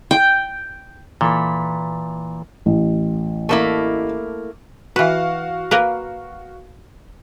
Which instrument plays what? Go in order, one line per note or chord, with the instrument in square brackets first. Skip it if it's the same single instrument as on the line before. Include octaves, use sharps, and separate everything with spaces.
[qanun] G5
[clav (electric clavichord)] A#2 [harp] E3 A4 B5
[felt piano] A1
[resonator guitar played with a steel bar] A3 A#3 E4
[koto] E3 B4 [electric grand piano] F#4 F5
[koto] A#3 A#4 B4